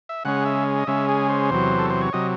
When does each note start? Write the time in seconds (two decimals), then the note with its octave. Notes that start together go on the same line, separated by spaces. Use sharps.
0.09 E5
0.25 C#3 G#3 C#4 F#5
0.45 E5
0.78 D#5
0.87 C#3 G#3 C#4 E5
1.09 G#4
1.29 C5
1.50 E2 C3 F#3
1.79 A4
1.90 C5
2.01 C#5
2.13 C3 F#3 D#5